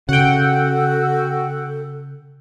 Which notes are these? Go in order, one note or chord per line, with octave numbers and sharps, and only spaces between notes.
C#3 F#4 A4 F#5 G5